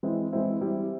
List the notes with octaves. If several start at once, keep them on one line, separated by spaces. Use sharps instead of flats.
E3 G#3 C4 E4
E3 G#3 C4 E4
G3 C4 E4